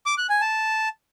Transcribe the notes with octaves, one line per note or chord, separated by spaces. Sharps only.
D6
F#6
G#5
A5